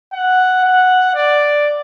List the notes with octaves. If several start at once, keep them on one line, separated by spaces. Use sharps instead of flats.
F#5
F#5
D5